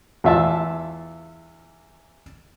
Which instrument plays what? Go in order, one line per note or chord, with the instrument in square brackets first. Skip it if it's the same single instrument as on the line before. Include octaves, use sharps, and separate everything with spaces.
[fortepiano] E2 F4 E5 A5 E6